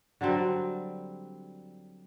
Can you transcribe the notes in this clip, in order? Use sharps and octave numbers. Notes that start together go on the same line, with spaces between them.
D3 F#3 G3 C4